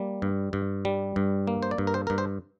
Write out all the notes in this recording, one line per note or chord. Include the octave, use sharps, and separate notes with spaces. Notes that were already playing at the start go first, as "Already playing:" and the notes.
Already playing: G3 A#3
G2
G2
G3
G2
A#3
C5
D5
G2
A#4
C5
G2 A#4
C5